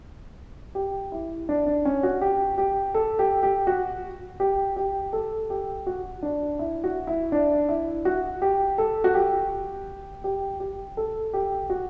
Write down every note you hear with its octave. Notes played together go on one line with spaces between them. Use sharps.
G4
E4
D4
D4
C#4
F#4
G4
G4
A4
G4
G4
F#4
G4
G4
A4
G4
F#4
D4
E4
F#4
E4
D4
E4
F#4
G4
A4
F#4
G4
G4
G4
A4
G4
F#4